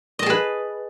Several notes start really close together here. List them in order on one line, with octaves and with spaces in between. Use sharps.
D#5 A5 G#4 B4